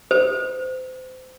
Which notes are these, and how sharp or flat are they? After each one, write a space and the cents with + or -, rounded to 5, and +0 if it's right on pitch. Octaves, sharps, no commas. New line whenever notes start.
C5 -30